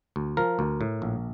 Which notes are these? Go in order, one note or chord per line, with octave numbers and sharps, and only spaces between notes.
D2
F3 A#4
D2
A2
A#1